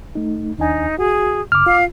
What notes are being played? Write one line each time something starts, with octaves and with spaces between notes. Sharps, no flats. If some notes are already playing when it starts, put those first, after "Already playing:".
A3 D#4
D#2 D4 D#4 G#5
F#4 G#4
F#2 C#3 D6 F6
F4 F5